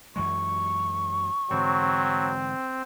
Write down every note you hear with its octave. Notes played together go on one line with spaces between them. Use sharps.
F#2 E3 G#3 C#6
G#2 D3 E3 F#3 C4